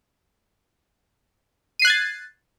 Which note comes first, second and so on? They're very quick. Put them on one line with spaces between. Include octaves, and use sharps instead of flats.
D#7 C7 F#6 G#6 A6